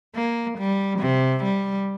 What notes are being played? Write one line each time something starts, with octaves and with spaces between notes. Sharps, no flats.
A#3
G3
C3
G3